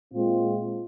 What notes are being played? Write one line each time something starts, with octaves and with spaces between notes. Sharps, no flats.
A#2 G#3 C4 F4